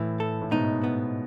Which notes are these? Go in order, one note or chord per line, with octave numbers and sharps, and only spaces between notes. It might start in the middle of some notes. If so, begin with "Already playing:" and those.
Already playing: A2 E3
A4
A2
G#2 B2 D#4
B3